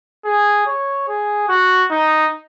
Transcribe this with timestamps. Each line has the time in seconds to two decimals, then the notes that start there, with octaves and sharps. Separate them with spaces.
0.25 G#4
0.66 C#5
1.08 G#4
1.49 F#4
1.91 D#4